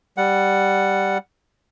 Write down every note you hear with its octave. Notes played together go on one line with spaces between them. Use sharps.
G3 F#5